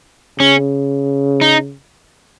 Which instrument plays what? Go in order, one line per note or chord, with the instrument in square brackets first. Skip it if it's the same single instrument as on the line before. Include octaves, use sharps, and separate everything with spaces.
[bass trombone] C#3 [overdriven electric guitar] C#4
[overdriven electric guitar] D#4